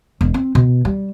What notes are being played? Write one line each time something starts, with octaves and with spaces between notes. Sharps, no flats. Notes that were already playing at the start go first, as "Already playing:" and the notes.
E1
C4
B2
G3